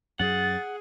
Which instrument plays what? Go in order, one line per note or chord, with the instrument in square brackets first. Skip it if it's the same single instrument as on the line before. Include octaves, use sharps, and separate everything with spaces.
[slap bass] F#2 F#3 [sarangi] G#4 [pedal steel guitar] F#5 [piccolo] A6